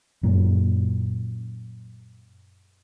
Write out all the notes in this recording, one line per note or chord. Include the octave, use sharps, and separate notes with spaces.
F#2 A#2